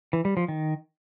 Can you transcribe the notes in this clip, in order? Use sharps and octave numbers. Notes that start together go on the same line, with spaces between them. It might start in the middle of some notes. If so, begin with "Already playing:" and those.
E3
G3
F3
D#3